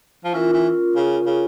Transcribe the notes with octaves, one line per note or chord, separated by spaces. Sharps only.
F3
E3 C#4 F4 A#4
E3
C#3
C#3